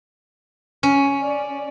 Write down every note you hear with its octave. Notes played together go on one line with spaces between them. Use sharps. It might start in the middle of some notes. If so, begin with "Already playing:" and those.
C#4
D5